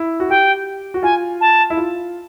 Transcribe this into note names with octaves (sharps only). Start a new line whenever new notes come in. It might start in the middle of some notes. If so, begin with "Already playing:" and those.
Already playing: E4
F#4
G4 G5
F#4
F4 G#5
A5
E4
F4